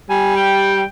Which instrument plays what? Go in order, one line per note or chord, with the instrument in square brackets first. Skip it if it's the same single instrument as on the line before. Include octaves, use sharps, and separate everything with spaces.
[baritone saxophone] G3 [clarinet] G#5
[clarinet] G5